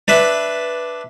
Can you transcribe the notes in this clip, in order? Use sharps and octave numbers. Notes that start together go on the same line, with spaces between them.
D4 B4 E5